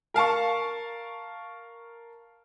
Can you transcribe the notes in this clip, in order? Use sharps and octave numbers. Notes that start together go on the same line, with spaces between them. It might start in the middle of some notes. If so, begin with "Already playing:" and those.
A#4 F5 A5 C#6